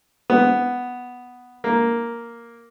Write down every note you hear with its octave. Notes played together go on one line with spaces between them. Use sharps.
B3
A#3